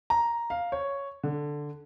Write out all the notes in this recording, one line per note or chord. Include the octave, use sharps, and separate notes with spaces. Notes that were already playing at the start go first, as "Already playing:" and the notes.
A#5
F5
C#5
D3